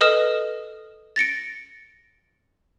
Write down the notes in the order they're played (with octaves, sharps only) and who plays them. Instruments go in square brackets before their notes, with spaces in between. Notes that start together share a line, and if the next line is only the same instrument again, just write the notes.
[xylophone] A4 B4 D#5 D#6 F6 E7
A6 A#6 C#7 D7